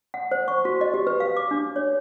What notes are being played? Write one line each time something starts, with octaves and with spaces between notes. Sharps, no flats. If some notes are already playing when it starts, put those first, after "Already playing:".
F#5
C5
C#6
F#4
D#5
G4
B4
F5
D6
D4
C#5